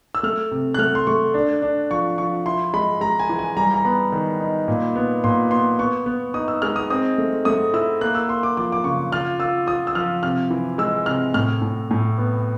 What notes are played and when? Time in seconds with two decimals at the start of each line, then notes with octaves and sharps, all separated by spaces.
0.15 E6
0.23 A3 F6
0.51 C3
0.74 F#6
0.78 A3 F6
0.95 C6
1.07 A3 C#6
1.34 D4
1.62 D4
1.91 F3 C#6
2.18 F3 C#6
2.46 E4 C6
2.74 G#3 B5
3.01 G#3 A#5
3.19 G#5
3.29 E3
3.39 G#5
3.57 G3 A#5
3.74 A#5
3.85 B3 B5
4.12 D#3
4.40 D#4
4.68 A#2
4.95 B3
5.24 A#2 C6
5.51 B3 C6
5.79 B3 C#6
6.06 B3
6.34 D#4 D#6
6.48 E6
6.62 G#3 F6
6.76 D#6
6.90 C4 D#6
7.18 A3
7.45 A3 D#6
7.74 E4 E6
8.01 A#3 F#6
8.15 E6
8.29 A#3 C6
8.43 D6
8.57 F3 D6
8.72 D6
8.84 C#3 C#6
9.12 F4 F6
9.40 F4 E6
9.67 F4 D#6
9.87 E6
9.95 F3 F6
10.23 C3 F6
10.51 E3
10.78 G#3 E6
11.06 C3 F6
11.34 A2 F6
11.62 A2
11.91 A2
12.18 B3